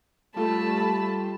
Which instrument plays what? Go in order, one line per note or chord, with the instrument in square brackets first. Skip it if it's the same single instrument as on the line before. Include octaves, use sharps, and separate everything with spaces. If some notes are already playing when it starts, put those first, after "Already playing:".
[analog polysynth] G3 F4 [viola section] A3 [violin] A5 B5